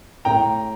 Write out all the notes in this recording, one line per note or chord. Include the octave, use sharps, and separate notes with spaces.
A2 G5 A#5